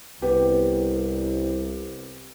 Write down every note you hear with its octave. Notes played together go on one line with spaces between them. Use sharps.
C2 B3 G4